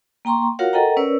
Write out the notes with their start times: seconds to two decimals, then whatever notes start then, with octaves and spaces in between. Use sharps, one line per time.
0.25 A#3 G5 A#5 C6 C#6
0.59 F4 F#4 A#4 C#5 F5 F#5
0.73 A4 A#4 D#5 F#5 G5 A#5
0.97 C#4 A#4 B4 C#5 D5 E6